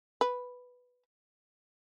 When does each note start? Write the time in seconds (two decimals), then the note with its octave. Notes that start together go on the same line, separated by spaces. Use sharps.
0.21 B4